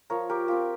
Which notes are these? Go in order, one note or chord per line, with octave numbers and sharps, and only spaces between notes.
F3 A#4 C#5
G4 A#4
C4 F4 G4